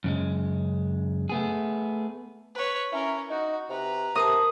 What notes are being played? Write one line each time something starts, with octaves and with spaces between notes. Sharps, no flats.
F#2 C#3 G#3
A3 B3 G#4
B4 C#5
C#4 E4 A#4
D#4 F#4
C3 B4 A#5
C3 A#4 C5 A5 D#6